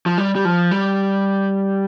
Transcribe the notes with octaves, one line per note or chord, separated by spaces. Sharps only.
F3
G3
G3
F3
G3